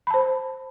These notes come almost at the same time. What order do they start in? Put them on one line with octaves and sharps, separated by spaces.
B5 A5 C5